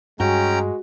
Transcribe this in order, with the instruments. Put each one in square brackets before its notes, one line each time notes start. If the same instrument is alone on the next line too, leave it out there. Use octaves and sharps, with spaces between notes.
[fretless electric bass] G2 [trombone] G#3 [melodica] C#4 G5 A#5 [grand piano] F#4